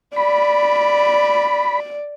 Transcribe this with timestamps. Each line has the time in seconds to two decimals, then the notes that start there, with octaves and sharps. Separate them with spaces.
0.16 D5 B5